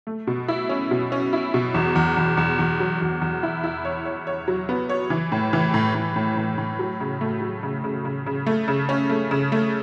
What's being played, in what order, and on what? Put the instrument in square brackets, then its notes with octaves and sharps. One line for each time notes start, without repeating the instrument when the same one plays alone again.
[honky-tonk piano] A3
B2
E4
C#4
B2
C#4
E4
B2
E2
E2
E2
E2
E2
F#3
E2
E2
E4
E4
C#5
C#5
C#5
F#3
B3
C#5
E3
A2
E3
A2
A2
A2
A2
A2
F#3
C#3
A3
F#3
C#3
C#3
C#3
C#3
A3
C#3
C#4
A3
C#3
A3